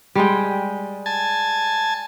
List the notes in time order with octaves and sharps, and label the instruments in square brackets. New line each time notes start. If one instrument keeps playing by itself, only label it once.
[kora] G3 G#3 G5
[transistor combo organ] G#5 A5